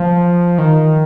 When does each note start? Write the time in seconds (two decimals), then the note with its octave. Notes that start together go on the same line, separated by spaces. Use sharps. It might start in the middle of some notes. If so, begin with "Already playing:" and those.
Already playing: F3
0.58 D#3